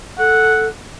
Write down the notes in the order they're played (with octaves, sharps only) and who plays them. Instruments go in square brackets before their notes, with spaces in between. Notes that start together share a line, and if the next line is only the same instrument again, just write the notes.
[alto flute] A4 [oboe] F#5